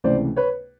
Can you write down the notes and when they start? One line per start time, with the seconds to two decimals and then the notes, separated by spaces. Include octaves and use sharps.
0.04 C#2 C3 E3 A3 C5 D5
0.36 B4 C#5